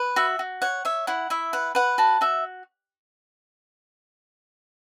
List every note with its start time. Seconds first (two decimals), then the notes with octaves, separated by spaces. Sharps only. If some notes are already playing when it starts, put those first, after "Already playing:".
Already playing: B4
0.16 F#4 E5
0.39 F#4
0.62 C#5 F#5
0.85 C#5 E5
1.07 E4 F#5
1.30 E4 E5
1.53 B4 F#5
1.75 B4 F#5
1.98 F#4 A5
2.21 F#4 E5